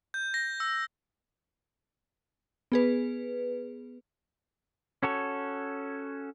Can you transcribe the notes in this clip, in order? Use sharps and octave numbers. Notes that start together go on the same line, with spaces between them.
G6
A#6
E6
B3 G#4 B4
C#4 F#4 A4 C#5